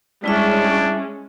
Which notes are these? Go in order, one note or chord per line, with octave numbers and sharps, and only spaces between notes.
G3 G#3 C#4 D4 E4 E5